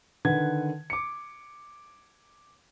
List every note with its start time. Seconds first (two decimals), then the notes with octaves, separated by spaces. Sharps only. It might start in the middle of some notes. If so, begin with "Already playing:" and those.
0.25 D3 D#3 B4 F#5 G#6
0.90 D6 C#7